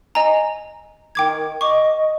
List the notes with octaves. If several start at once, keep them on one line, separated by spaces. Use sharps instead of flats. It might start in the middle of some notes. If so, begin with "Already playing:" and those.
D#5 G#5 A#5
D#3 G5 D6 G#6
D#5 C#6 D6